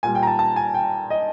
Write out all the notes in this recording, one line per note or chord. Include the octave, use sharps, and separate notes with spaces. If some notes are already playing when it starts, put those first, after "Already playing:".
A#2 G3 G#5
G5
A#5
A5
A5
G#5
G5
D#5